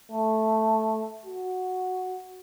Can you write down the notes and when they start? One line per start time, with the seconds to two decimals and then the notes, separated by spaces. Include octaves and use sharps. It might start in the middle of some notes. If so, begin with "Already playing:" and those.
0.11 A3
1.25 F#4